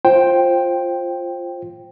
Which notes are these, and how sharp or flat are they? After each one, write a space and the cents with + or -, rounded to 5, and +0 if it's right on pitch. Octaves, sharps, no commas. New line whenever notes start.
F4 +0 C5 +15 G5 +0